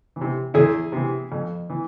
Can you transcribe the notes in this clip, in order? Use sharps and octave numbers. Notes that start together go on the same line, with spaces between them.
E3
C3
E2 E4 G#4
C3 E3
F2
E3